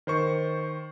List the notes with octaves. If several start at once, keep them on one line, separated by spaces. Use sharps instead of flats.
D#3 C5 C#6